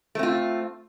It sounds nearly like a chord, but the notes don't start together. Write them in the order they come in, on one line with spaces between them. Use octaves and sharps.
A3 C4 F4